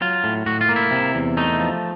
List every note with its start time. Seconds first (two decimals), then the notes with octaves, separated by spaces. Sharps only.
0.01 F#3 F4
0.24 A2
0.46 A2 F#4
0.61 F4
0.69 A#3
0.76 E4
0.91 C3
1.15 E2
1.37 A3 D#4
1.59 F3